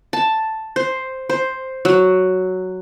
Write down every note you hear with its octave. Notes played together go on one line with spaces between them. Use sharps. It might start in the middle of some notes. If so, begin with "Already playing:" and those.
A5
C5
C5
F#3